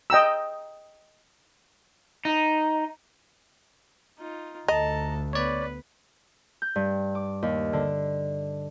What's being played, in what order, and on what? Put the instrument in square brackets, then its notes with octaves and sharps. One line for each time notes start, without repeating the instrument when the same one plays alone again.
[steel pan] D#5 G5 A#5 E6
[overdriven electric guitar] D#4
[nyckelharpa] D#4 F4
[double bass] D2 [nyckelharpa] A4 A5 [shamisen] D#5 [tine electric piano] A#5
[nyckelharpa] B3 B4 [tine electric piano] C#5 D5
[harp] G6
G2
D6
D#2
D3